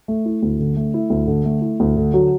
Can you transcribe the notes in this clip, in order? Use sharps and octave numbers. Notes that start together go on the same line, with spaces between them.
A3
E4
D2
D3
A3
E4
D2
D3
A3
E4
D2
D3
F#3